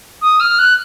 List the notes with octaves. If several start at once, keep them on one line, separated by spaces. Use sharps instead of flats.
D#6
F6
F#6